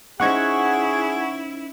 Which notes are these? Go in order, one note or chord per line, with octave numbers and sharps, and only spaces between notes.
C#4 D#4 E4 G#4 C5 F#5 C#6 G#6